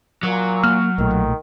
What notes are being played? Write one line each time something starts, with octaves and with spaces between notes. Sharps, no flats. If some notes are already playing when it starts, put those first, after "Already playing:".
A#2 F#3
A#3 F6
B1 A#2 D#3 A3